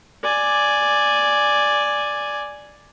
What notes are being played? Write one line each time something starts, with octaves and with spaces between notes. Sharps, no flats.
D5 G#5